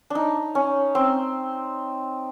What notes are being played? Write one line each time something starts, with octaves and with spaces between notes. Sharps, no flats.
D4 D#4
C#4
C4